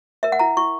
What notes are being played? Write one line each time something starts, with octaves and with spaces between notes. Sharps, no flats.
A#4 E5
F#5
E4 A#5
E4 C#6